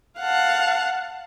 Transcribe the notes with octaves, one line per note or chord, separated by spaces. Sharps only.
F5 F#5 A5